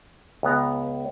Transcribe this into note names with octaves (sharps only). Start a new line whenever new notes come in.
C#2 B3 A#5